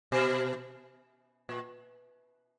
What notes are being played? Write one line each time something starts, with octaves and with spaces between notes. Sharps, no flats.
B2
A#2